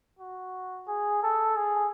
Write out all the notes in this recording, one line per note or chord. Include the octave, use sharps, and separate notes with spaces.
F#4
G#4
A4
G#4